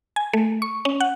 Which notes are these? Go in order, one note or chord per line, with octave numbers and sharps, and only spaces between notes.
G#5
A3
C#6
C#4
F#5